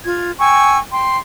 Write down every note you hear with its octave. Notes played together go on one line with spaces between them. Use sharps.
F4 G#6
G5 G#5 C#6 E6
G5 C6